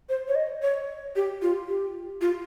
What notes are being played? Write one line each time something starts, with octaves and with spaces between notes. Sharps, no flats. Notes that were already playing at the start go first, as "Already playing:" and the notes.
C5
C#5
D#5
C#5
G4
F4
G4
F4